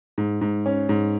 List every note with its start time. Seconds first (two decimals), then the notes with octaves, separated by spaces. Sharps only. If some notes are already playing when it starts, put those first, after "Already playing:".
0.18 G#2
0.41 G#2
0.66 C#4
0.89 G#2